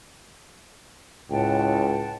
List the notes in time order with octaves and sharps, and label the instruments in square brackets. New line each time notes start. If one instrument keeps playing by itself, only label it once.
[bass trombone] C#2 [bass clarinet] A2 [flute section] F#5 G5 A5